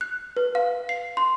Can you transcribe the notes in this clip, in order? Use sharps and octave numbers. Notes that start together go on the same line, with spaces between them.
F#6
B4
F5
C7
C6